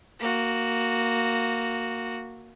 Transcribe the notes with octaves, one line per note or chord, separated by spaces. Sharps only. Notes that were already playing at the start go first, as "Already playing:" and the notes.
A#3 F#4